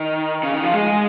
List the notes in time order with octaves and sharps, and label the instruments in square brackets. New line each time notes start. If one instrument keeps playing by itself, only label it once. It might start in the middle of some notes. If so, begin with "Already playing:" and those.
Already playing: [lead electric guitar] D#3
C#3
D#3
F3
G#3